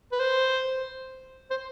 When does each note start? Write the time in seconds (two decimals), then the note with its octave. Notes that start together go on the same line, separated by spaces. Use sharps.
0.12 B4
0.20 C5
1.50 C5